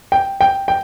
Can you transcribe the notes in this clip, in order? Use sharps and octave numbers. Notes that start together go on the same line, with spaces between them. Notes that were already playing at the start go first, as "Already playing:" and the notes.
G5
G5
G5